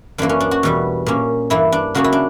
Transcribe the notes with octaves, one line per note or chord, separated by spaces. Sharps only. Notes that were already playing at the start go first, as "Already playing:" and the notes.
F#2 E3 A#3 D4
C#4
D4
F#4
E2 B2 G3
A#2 A#3 C#4
G2 E3 A#3 E4
D4
C#3 F#3 A#3 C#4 F#4
E4
D4